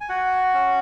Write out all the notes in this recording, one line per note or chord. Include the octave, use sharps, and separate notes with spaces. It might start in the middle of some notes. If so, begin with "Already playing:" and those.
G#5
F#4 F#5
C#4